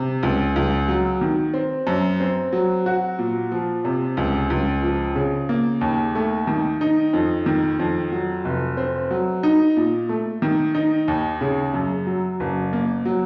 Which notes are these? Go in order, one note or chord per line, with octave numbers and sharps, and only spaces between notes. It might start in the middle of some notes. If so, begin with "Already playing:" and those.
Already playing: C3
C#2
C#2
F#3
D#3
C4
F#2
C4
F#3
F#4
A#2
F3
C3
C#2
C#2
F3
C#3
A#3
D#2
A3
D#3
D#4
F2
D#3
F2
F#3
F1
C4
F#3
D#4
A#2
A3
D#3
D#4
D#2
C#3
F#2
F#3
F#1
A#3
F#3